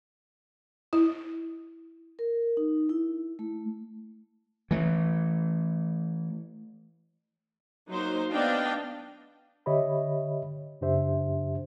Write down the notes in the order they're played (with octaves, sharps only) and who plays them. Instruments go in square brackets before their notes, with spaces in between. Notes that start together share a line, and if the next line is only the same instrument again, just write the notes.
[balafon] E4
[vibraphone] A#4
D#4
E4
A3
[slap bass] E3 A3
[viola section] F#3 A#3 D#4 C5 C6
B3 D4 D5 D#5 F5 G5
[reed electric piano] D3 G4 C#5 D#5 E5 B5
F#2 C#3 D4 G4 C5 E5